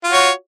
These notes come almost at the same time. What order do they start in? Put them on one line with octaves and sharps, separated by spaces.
F4 F#4 C#5